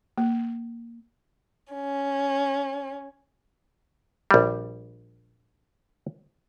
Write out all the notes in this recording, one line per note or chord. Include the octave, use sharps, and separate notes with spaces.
A#3
C#4
A#1 G3